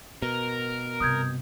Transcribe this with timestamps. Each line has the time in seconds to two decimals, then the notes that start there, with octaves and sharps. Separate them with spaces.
0.22 B2 A#4
1.00 G2 C3 D#6 G6 G#6